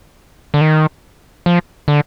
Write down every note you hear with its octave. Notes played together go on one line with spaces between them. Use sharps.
D3
D#3
F3
D3